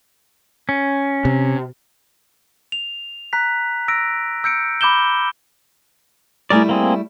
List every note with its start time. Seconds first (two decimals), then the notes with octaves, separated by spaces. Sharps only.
0.69 C#4
1.25 C3
2.72 F7
3.33 A#5 F#6 B6
3.88 E6 A#6 D7
4.44 E6 G6 C#7 D7
4.81 B5 D6 G6 E7 G7
6.50 G3 A3 E4 G#4 A#4 D5
6.69 A#3 C4 G#4